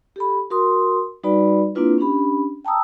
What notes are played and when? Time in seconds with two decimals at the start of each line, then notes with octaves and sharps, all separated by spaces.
0.16 G4 A4 B5
0.50 F#4 A#4 C6 D#6
1.23 G3 D#4 F#4 B4 D5 B5
1.75 A#3 C4 D4 E4 F4 B4
1.98 C#4 D4 G4 B5
2.65 G5 A5 A#5 D#6 E6